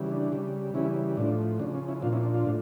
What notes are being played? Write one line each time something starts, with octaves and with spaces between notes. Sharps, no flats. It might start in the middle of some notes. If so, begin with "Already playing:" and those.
Already playing: C#3 E3 G3
D4
C#3 G3
C#3 E3 G3 C#4 E4
A2 F3 D4
C#3 F3 D4
C#4
C#4 E4
A#2 F3 D4 F4
C#4 E4
D4
D4 F4
A2